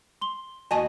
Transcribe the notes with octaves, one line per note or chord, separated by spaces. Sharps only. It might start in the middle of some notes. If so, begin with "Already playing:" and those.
C6 G7
D#2 F#4 D#5 G#5 A5 D#7